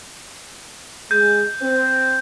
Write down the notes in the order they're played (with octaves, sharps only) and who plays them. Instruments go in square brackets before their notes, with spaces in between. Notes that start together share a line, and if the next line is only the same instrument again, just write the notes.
[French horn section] G#3 [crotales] G6
[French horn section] C4